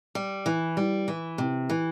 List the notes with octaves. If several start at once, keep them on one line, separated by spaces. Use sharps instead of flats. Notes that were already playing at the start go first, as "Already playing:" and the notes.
G3
E3
G3
E3
C3
E3